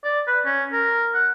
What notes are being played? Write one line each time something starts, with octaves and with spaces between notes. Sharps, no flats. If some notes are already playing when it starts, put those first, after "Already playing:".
D5
B4
C#4
A#4
F#5